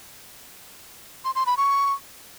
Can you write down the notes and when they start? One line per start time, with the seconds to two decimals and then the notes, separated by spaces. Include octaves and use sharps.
1.25 C6
1.35 C6
1.46 B5
1.57 C#6